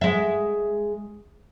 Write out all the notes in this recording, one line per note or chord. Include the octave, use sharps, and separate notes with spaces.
G#3 E5